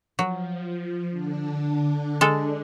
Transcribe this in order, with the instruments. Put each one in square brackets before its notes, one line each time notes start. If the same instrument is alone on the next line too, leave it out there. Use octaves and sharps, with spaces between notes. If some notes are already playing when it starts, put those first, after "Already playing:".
[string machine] F3 [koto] F#3
[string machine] D3 D4
[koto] G#3 A4